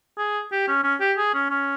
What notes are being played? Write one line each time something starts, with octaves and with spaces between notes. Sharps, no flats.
G#4
G4
C#4
C#4
G4
G#4
C#4
C#4